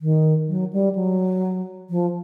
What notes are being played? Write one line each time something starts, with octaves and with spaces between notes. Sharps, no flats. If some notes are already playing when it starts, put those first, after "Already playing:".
D#3
F#3
G3
F#3
F3